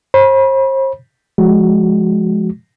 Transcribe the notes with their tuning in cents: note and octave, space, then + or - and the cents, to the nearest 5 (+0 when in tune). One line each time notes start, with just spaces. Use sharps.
C5 +40 B5 -30
F3 +0 G#3 +15 F#4 +0